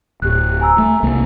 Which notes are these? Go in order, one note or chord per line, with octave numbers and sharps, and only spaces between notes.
D1 G4 F#6
G#5 A#5 E6
A3
C2 A3 A#3